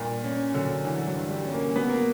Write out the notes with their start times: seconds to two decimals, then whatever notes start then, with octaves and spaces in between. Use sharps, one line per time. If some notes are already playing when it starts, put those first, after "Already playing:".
Already playing: G2 A#2
0.24 C#4
0.54 D3 F#3
0.84 D3 E3
1.07 F#3
1.16 G2
1.30 G3
1.45 C#4
1.53 A#3
1.76 F#3 B3
1.90 A#3